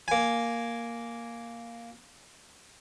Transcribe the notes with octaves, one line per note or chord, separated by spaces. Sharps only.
A#3 G#5